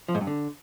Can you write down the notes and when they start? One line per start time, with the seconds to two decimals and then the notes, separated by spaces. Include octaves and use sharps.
0.08 F3
0.15 G#2
0.21 G2
0.27 D3